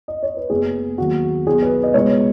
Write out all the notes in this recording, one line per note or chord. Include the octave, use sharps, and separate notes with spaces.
D#5
C#5
B4
F#1 F#2 F#3 B3 G#4
D#2 D#3 F#3 B3 F#4
B1 B2 F#3 B3 G#4
B4
D#5
C#2 B2 G#3 C#5